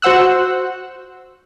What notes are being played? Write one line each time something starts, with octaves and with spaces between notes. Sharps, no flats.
F#4 C5 F#5 E6 F#6